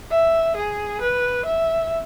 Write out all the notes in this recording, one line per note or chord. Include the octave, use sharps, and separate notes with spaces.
E5
G#4
B4
E5